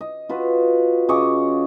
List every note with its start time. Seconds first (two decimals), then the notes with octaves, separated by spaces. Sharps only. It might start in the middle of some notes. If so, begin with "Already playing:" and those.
0.01 D#5
0.29 F4 F#4 B4
1.09 C#3 D#5 C#6 D6